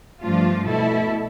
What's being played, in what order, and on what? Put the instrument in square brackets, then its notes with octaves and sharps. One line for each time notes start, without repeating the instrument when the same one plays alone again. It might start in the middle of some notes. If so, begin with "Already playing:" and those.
[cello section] G2 F3 A3 D4 F4
B2 A3 E4 A4